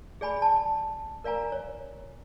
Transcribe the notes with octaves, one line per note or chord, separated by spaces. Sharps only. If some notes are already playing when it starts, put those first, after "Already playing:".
G#4 D5 G#5 B5
A5
A#4 D5 F5 G#5 A#5
C#5